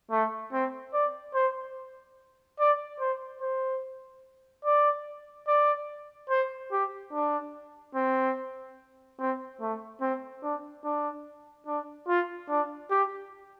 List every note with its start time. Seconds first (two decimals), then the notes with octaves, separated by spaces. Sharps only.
0.11 A3
0.52 C4
0.93 D5
1.34 C5
2.59 D5
3.00 C5
3.41 C5
4.64 D5
5.47 D5
6.29 C5
6.72 G4
7.12 D4
7.95 C4
9.19 C4
9.61 A3
10.01 C4
10.42 D4
10.84 D4
11.66 D4
12.08 F4
12.49 D4
12.90 G4